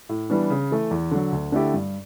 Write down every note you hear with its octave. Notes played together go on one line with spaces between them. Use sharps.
A2
E3 G3 B3 D4
C#3
E3 A3
E2
D3 F#3
D2
D3 A3 E4 G4
G2